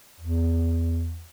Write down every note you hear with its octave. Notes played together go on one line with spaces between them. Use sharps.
E2